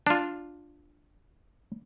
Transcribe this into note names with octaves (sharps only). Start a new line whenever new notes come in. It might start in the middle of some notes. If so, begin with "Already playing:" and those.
D4 F4